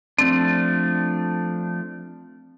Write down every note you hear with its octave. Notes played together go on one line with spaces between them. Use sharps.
F3 A3 C4 D4